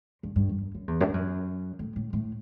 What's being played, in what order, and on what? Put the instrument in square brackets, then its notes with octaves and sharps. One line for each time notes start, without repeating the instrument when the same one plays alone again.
[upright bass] G2
G2
F#2
F#2
F#2
E2
F#2
G2
F#2
A2
A2
A2